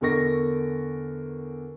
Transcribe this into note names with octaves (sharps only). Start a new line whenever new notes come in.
E2 D3 A#4 C#6 A#6